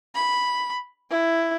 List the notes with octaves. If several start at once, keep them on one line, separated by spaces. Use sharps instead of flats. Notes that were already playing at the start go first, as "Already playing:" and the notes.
B5
E4